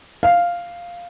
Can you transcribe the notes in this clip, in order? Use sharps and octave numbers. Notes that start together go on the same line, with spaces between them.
F5